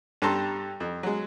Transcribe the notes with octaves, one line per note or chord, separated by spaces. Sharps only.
G2 G3 A4 A5 A#5 C6
F2
F#3 G#3